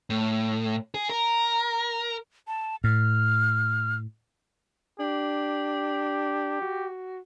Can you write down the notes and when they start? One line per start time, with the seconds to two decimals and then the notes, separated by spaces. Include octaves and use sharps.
0.10 A2
0.94 G#4
1.10 A#4
2.47 A5
2.84 A2 F6
5.00 D4 G4
6.61 F#4